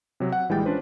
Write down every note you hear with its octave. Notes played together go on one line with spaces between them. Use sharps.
C3 F#3
F#5
A#1 E3 G3 G#3 G5 A6
C#4 D4 F4 B4 C5